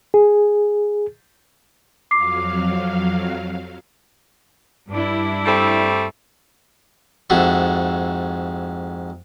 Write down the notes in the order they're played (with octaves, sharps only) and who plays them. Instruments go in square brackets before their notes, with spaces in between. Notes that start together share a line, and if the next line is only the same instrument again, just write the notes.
[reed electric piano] G#4
[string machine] F2 F#3 F5 [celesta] D6 C7
[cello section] G2 D4 E4
[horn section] G3 A3 C4
[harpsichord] F2 G#2 F#4 G#4 A4 E5